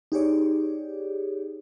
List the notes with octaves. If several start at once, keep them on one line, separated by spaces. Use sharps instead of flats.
D#4 G4 G#4 C#5 D5